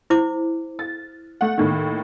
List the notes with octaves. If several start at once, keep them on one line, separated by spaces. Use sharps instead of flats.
E4 C5 D6
A6
A3 F#5
D#2 A2 D#3